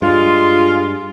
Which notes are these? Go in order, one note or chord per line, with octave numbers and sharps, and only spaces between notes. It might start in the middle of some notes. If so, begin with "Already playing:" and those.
G2 G#3 F4